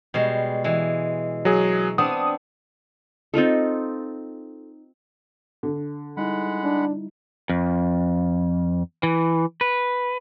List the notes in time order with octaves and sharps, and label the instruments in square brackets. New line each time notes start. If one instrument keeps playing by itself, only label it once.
[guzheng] B2 G3 G#3
E3 G#3
[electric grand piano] F#3 G#4
[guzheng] B3 C4 D4 [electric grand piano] D#6
[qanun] C4 D#4 F4 A4
[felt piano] D3
[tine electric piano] G3 D#4 E4 [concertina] G#3 F#5 B5
[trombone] D4
[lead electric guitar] F2
E3
B4